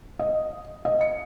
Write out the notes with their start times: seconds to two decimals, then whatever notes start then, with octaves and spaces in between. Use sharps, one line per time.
0.19 D#5
0.85 D#5
1.01 C#7